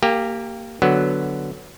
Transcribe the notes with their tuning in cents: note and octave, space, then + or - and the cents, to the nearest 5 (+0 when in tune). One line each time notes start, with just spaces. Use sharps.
A#3 -20 G4 +0 G#5 -35
D3 +0 F#3 +0 B3 -5